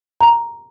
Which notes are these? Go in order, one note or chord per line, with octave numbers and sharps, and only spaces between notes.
A#5